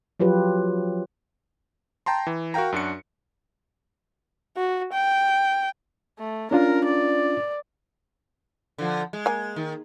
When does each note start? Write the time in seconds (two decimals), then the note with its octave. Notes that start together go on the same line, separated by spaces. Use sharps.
0.20 F3 F#3 F4 G4 B4
2.06 G5 A5 A#5 C6
2.27 E3
2.54 F#4 A#4 F5 G5 A#5
2.72 F#2 D4 F#4 C#7
4.57 F#4
4.92 G5
6.19 A3
6.51 C#4 D4 F4 A#4
6.85 D5
8.78 D3 F3
9.13 G#3
9.26 A#3 G#5
9.56 D#3